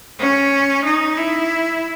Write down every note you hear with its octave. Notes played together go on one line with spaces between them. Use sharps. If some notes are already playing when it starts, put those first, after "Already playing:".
C#4
D#4
E4